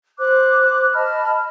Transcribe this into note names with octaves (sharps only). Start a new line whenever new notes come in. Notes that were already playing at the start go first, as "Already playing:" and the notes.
C5 D6 F#6
D#5 A5 B5 F6